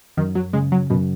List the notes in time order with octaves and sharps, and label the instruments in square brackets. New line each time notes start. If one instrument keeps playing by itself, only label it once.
[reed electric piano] F#2 [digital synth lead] D#3
[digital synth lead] F#3
[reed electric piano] C#3 [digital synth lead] G#3
[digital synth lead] F#3
[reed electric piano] F#2 [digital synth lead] B2